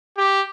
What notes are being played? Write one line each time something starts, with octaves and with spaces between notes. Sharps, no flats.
G4